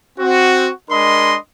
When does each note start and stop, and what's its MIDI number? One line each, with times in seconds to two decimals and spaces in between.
0.19 0.70 60
0.19 0.70 66
0.90 1.36 56
0.90 1.36 62
0.90 1.36 70
0.90 1.36 75
0.90 1.36 83
0.90 1.36 84